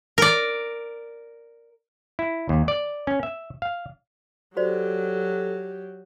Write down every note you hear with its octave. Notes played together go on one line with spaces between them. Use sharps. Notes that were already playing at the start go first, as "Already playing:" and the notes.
A#4 D5
E4
D#2
D5
C#4
E5
F5
F#3 F#4 G4 A4 C5 D5